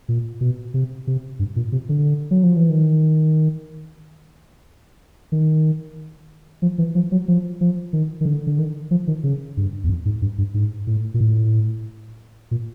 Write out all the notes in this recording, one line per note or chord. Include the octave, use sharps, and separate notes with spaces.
A#2
B2
C3
C3
G2
A#2
C3
D3
F#3
F3
E3
D#3
D#3
F3
E3
F3
F#3
F3
F3
D#3
D#3
D3
D3
D#3
F3
D#3
C#3
G2
E2
F2
G#2
G2
G2
G#2
A2
A#2
A2
A#2